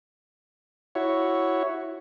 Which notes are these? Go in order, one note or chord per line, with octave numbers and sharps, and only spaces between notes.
E4 F#4 C#5